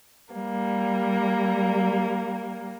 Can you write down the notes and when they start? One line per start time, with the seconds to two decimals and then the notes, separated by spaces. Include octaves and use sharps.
0.34 G3 A#3